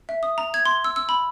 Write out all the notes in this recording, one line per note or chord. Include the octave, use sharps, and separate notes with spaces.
E5
D#6
A#5
G#6
C6
E6
E6
B5